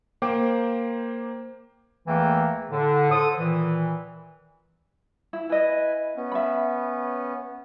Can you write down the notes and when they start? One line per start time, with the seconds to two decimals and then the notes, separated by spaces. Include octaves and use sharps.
0.22 A#3 C5 G5 D6
2.06 E2 E3 A3 A#3 G5
2.71 A2 D3
3.11 A4 C5 D#6
3.37 A#2 D#3 E3
5.33 E4
5.50 E4 B4 D#5 G#5
6.16 B3 C#4
6.32 E5 B5